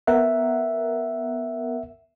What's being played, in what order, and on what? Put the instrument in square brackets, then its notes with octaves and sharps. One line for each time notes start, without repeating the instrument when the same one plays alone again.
[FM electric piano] B3 A#4 F#5 [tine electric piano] E5